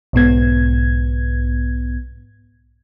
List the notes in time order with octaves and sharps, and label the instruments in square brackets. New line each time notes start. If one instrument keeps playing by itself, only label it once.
[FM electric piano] B1 G#2 B3 G#6